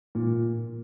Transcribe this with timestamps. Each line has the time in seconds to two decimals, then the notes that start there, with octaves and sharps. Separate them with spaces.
0.15 A#2